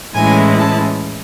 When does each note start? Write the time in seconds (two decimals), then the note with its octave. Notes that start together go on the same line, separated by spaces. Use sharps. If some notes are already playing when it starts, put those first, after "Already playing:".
0.14 A2 E3 G#3 C#4 E4 G#5
0.59 A5